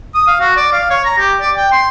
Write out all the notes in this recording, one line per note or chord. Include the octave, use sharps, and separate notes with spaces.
D#6
F5
F#4
D5
F5
C#5
A#5
G4
D5
G5
C6